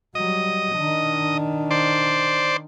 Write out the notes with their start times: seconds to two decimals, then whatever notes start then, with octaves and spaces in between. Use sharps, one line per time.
0.15 F#3 G3 D#5
0.75 D#3 D4
1.71 C5 D5